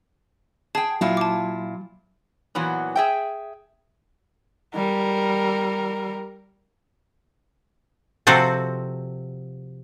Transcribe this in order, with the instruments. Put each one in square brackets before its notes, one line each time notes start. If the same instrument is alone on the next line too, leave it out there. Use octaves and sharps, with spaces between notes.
[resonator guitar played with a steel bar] G#4 G5 [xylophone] A5
[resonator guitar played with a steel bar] A#2 E4 F4 [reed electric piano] F#3
[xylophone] A5 D6
[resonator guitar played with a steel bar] A#2 E3 F#3 B3
G#4 E5 G5
[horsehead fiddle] G3 A#4
[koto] C3 F3 C4 F#4 A4